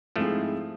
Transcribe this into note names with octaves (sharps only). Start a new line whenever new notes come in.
G#2 F3 G#3 A3 C4 E4 G#4